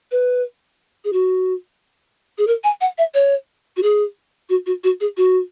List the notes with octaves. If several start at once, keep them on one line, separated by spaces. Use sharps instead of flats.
B4
G#4
F#4
G#4
A#4
G#5
F#5
E5
C#5
F#4
G#4
F#4
F#4
F#4
G#4
F#4